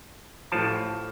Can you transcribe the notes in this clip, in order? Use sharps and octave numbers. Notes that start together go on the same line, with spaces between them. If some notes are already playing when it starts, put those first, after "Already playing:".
A1 A2 F3 A5